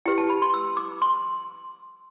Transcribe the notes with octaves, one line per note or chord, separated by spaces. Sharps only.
E4 G4 B4 G5
A5
B5
C6
E6
D6
C6